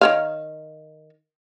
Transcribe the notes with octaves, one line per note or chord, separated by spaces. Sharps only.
D#3 C#5 F5